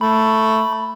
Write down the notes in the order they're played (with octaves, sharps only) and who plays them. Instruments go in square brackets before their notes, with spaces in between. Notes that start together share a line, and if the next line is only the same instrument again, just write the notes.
[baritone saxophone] A3 [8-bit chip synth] B5